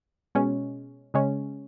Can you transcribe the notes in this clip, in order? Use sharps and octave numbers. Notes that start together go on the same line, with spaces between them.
B2 G#3 C#4
C#3 G#3 C#4